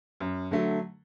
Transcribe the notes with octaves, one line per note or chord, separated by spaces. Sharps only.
F#2
D3 F#3 A3